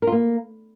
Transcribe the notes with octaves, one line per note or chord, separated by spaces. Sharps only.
A#4
F4
A#3